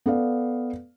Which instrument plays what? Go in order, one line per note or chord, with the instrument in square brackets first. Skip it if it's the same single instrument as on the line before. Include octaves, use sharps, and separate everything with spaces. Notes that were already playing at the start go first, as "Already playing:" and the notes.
[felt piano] B3 A4 D5 F5